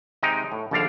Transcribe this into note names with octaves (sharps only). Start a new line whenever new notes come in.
C3 G#3 D#4 G5 A#5
A2
A#1 D#2 D3 A4 D5 F5